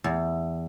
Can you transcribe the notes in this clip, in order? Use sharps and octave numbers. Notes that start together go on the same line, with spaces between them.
E2